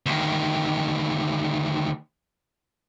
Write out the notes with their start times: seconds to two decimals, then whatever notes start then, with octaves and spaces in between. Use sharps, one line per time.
0.06 D2 D#3